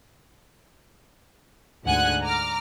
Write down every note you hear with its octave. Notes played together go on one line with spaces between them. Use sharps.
D2 G#2 D3 F#5 G#5 F#6
A#5 D6 F6